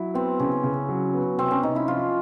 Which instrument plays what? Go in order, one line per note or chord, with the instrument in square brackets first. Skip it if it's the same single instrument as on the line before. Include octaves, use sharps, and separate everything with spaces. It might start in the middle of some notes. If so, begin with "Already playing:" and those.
Already playing: [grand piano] F#3 [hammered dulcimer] E4
[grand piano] B3 [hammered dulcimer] C4
[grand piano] C#3 [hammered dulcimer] C#4
[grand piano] C#3
F#3
B3
[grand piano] C3 [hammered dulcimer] C4
[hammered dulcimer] C#4
[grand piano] C3 [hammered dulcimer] D#4
[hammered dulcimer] E4
[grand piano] F3 [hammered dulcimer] F4